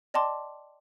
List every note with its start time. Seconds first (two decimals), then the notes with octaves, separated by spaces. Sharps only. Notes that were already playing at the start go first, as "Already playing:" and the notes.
0.14 D5 D#5 G5 A5 C6 D6